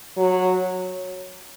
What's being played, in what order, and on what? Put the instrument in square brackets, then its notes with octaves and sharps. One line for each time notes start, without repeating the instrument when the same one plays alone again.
[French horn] F#3